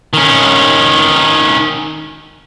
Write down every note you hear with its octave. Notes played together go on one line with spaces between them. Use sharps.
D#3 C#4